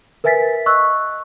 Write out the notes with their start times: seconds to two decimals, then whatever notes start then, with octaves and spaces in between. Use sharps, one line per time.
0.24 A#4 B4 E5 G#5 A6 B6
0.66 D#5 C#6 E6 F#6